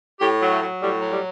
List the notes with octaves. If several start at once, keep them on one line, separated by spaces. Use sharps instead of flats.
A2 G4
F#3
A3
F#3
A2 G3
F#3
G3